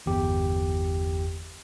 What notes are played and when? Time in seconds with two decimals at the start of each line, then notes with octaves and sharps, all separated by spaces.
0.06 G1 E2 G4